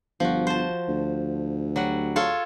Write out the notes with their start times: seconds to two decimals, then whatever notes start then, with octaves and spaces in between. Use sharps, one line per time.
0.20 G1 F3 F#4
0.47 C5 A5
0.88 D2
1.76 F#3 G3 F#5
2.16 F4 A4 C#5